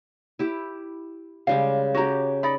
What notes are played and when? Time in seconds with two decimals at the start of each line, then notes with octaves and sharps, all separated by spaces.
0.39 E4 G4
1.47 C#3 G3 G#3 F5
1.94 C#4 F#4 G4 A#5
2.43 D#4 D5 B5